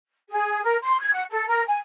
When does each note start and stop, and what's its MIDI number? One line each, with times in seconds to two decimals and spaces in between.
0.30 0.60 68
0.64 0.77 70
0.83 1.00 84
1.01 1.10 92
1.13 1.23 78
1.30 1.45 69
1.48 1.63 70
1.67 1.79 80